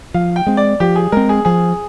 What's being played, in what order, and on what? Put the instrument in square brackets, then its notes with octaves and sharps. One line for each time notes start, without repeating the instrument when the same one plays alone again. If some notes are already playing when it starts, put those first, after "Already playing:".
[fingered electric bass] F3 [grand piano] F5
[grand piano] G5
[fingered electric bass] G#3 C4
[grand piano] D5
[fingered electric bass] F3 [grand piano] G4
[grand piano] G#4
[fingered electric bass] G#3 C4 [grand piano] A#4
[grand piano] G#4
[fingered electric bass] F3 [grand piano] G#4